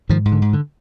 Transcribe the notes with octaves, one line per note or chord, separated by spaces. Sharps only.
G#2 D#3 F3
G#2
D3
G#2
D3